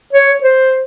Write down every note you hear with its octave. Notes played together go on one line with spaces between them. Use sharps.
C#5
C5